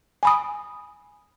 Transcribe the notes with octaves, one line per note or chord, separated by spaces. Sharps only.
G#5 B5 D#6